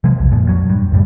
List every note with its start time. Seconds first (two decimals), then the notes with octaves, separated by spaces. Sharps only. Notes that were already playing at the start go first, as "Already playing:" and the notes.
0.04 C3 F3 G#3
0.19 B1 E2
0.31 F#2 A#2 F3
0.47 F2 F#3
0.70 G2
0.92 C#2 F#2 A2 G3